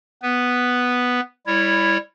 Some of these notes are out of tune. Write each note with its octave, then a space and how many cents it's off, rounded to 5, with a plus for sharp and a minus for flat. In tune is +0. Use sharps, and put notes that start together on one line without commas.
B3 +0 B4 +0
G3 +20 E4 +0 C#5 -10